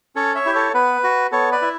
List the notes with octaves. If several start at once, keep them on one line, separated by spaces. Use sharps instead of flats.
C#4 A4 C#5
C#5 E5
E4 G4
A4 C#5
B3 B4
F#4
B3 A4 C#5
B4 D5
E4